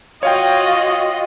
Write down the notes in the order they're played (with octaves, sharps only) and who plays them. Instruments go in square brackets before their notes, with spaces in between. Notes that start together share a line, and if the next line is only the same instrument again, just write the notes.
[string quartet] F4 F#4 [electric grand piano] C#5 F5 G5 [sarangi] D#5